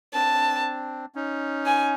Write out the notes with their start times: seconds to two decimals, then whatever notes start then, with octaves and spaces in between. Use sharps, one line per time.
0.14 C4 D4 A5
1.15 C#4 D#4
1.66 G#5